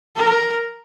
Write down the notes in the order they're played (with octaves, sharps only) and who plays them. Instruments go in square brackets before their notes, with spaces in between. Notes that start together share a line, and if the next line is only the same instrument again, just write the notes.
[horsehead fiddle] A#4